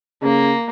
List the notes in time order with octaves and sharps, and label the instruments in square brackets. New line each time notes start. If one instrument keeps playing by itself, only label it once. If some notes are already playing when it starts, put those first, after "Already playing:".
[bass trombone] C#3 [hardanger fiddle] A#3